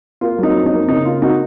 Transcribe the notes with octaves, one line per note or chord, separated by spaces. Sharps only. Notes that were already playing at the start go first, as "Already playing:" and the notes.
A#3 F4
F#3 D#4
F2
D#4
A#3
C#3 D#4
A#3 F4
D#4 F#4